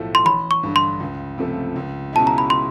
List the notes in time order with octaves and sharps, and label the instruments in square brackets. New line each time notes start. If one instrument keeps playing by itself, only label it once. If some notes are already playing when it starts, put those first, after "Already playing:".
Already playing: [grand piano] B1 A2 F3 A3
[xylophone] C6
[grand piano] A1 [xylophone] B5
[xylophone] C#6
[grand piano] G2 D3
[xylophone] C6
[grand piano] C#2
C3 F3 A3
C#2
[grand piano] B2 G#3 C#4 E4 [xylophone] A5
[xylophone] A#5
B5
C6